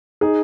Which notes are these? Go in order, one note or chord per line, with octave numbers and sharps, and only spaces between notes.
D#4 G#4